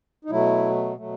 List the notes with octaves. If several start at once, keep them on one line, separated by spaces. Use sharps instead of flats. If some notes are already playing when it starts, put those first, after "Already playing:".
D#4
B2 F#3 A3 E4
B2 F#3 A3